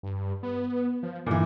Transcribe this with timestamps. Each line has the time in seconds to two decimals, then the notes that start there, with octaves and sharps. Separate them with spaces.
0.03 G2
0.43 B3
1.03 F3
1.26 G2 A#2 E3